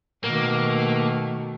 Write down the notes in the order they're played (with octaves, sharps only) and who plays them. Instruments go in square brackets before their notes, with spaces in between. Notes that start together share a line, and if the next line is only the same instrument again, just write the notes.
[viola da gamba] B2 D#3 A3 [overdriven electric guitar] A#3